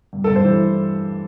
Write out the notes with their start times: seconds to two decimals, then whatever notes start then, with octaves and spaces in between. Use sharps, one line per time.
0.13 G2
0.24 G2 A4
0.36 C5
0.44 E3